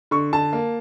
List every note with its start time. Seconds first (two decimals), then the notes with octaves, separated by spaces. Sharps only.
0.11 D3 C#6
0.33 D3 A5
0.53 A#3